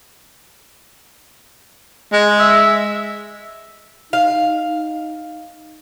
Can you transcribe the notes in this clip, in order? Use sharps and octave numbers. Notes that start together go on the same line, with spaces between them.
G#3
E5
D#4 F5